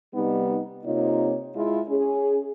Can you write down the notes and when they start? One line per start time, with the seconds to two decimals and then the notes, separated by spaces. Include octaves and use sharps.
0.14 C3 G3 B3 D#4
0.85 C3 A#3 D#4 F4 C#5
1.56 G#3 E4 F4
1.88 C#4 G#4